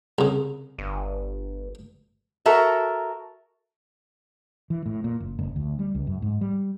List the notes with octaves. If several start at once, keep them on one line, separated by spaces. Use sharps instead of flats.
C2 C#3
G1
F#4 A4 A#4 E5
E3
A2
A#2
F#1
F#1
D2
G3
C#2
F#2
G#2
G3